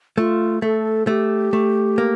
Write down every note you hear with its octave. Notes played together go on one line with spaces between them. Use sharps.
A3 F4
A3 A4
A3 G4
A3
A#3